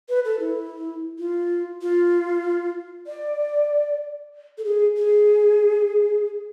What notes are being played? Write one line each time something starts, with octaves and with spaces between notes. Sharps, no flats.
B4
A4
E4
F4
F4
D5
A4
G#4
G#4